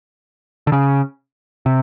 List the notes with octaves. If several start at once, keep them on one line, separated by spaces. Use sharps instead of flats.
D3
C#3
C3